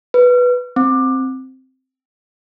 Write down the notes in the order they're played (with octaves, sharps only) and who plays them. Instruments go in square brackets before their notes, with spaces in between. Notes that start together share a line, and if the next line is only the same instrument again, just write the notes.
[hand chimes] B4
C4